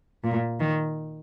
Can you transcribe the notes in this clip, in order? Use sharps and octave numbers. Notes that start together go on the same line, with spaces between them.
A#2
D#3